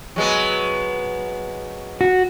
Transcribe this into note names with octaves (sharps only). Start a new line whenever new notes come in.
F#3 G#3 B3
F#4